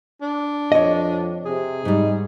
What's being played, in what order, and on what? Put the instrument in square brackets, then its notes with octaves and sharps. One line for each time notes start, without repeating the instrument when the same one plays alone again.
[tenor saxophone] D4
[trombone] F2 [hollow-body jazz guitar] C#5 D#5
[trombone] C3 [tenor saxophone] G#4
[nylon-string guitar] G#2 G3 [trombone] D#4